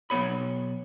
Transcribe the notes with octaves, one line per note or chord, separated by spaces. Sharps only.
B1 A#2 B3 C#5 B5